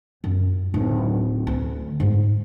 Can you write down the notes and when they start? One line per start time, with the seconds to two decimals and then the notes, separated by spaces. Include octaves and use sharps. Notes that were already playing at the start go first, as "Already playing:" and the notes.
0.24 F#2
0.74 D1 D#4
1.47 D2 C#4
2.00 G#2